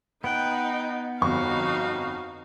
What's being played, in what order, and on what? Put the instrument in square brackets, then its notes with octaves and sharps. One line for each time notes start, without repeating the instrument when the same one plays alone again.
[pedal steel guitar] B3 F#5 [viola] D#4 [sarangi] G5
[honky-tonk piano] G1 F2 C#6 [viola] D#4 F5 [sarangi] F#4